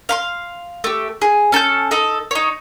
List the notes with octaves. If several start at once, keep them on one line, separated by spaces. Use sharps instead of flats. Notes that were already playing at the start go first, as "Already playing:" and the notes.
F5 B5 C6
A3 G4
G#4
C#4 A4 A5 G6
D#4 A4
D#4 C#5